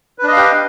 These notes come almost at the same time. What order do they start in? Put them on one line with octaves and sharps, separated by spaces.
B4 D4 D#5 F5 G4